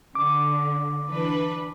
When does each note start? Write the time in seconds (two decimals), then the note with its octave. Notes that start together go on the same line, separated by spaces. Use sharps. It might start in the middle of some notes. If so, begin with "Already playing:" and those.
0.15 D3 D6
1.09 E3 D4 B4